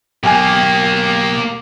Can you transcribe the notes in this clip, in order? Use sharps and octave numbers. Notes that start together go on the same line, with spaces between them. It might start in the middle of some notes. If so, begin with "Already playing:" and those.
B1 A#3 G4 G#5